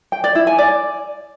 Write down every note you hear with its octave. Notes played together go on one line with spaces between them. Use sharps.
G5
D5
E4
G#5
D5